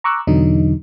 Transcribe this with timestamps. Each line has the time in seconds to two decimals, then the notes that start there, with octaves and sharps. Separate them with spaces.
0.04 A#5 C#6 D6 E6 F#6
0.27 E2 B2 D3 F#3 D#4